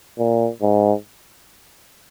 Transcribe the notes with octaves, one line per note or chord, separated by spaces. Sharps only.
A#2
G#2